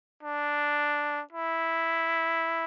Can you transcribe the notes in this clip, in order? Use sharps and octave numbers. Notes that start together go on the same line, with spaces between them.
D4
E4